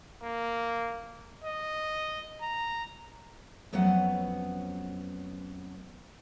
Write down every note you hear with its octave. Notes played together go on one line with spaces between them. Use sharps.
A#3
D#5
A#5
F2 F#3 A3 B3 C#4 F#5